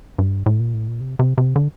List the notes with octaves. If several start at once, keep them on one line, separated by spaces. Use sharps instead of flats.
G2
A2
A#2
A2
A#2
C3
C3
C3
D3